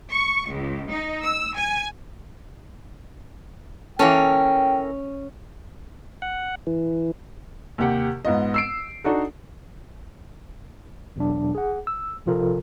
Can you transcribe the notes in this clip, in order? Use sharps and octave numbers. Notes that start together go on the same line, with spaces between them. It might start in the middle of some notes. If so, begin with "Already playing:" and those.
C#6
C#2
D#4
E6
G#5
E3 A#3 C#4 A4 G5
F#5
E3
D#2 C3 G4 F#5
G#2 B3 F4 D#5
E6 C7 D7
D4 D#4 F#4 A4
E2 B2 F#3 D4
G#4 F#5
E6
A#1 C3 F3 F4 A4 A#4